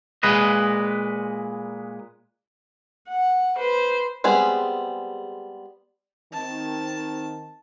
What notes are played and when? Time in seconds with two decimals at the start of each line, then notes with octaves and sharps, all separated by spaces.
0.23 A#2 G#3 B4 D#5
3.09 F#5
3.57 B4 C5
4.24 G3 G#3 B3 C4 G#4
6.33 D#3 C4 A5